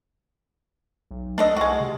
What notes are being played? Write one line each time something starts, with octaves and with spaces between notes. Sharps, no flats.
B1
A3 D4 A4 D#5
C2 G#3 F#4
C3